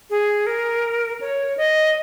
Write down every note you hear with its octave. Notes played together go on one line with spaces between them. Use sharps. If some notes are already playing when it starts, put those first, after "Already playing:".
G#4
A#4
C#5
D#5